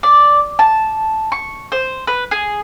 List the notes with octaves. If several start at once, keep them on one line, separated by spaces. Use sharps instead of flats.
D5
A5
C#6
C5
B4
G#4